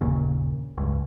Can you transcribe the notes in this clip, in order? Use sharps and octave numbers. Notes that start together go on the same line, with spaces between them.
G1 D#2 A#2 C#3
C#2 G2